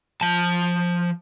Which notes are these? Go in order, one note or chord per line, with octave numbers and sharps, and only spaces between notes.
F3 A5